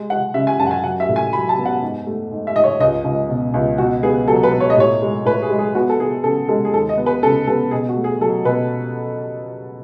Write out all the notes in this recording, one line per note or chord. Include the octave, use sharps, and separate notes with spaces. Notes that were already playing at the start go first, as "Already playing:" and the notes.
Already playing: G#3
G#3 F#5
C#3 E5
G#5
F#2 A5
F#5
G#5
F#3 F#5
E5
A2
G#5
F#3 B5
A5
B3
F#5
G#2
A3
G#2
E5
G#2 D#5
C#5
C#2 D#5
C#2
B2
C#2
B2 F#4
B3 G#4
F#3 A4
B4
B2
C#5
D#5
A2 C#5
G#3
A2 B4
G#4
G#3
G#4
B3 F#4
A4
B3 G#4
C#3 A4
G#3 A4
G#4
D#2 A4
D#5
B3
B4
C#3 A4
B3 A4
B2 G#4
F#4
A3
G#4
F#3 A4
B2 B4